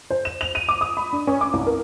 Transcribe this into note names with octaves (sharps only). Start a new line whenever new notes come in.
C5
E7
F7
D#7
D6
D#6
B5
D4
C#4
D6
C2
A#4